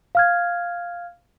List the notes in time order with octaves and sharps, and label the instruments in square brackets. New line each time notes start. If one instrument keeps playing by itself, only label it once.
[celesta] F5 F6 G#6